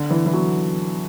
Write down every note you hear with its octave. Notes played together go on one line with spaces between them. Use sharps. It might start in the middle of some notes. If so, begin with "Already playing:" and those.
Already playing: D3
E3
E3
F#3